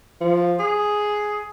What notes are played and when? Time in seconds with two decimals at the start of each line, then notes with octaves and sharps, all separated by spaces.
0.21 F3
0.59 G#4